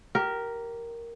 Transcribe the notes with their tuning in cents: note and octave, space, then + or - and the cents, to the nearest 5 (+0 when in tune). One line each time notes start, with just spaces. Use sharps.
G4 -20 A#4 +0